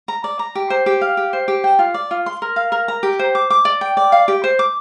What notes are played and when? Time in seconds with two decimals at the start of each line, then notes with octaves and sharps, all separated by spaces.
0.08 A#5
0.24 D5
0.39 A#5
0.55 G4
0.70 C5
0.86 G4
1.01 F5
1.17 G4
1.33 C5
1.48 G4
1.64 G5
1.79 F4
1.94 D5
2.11 F4
2.26 C6
2.42 A#4
2.56 F5
2.72 A#4
2.88 A#5
3.03 G4
3.19 C5
3.35 D6
3.50 D6
3.65 D5
3.81 G5
3.97 D5
4.12 F5
4.28 G4
4.44 C5
4.59 D6